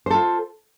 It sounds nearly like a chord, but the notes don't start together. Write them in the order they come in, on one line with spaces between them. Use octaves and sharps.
C5 A4 F4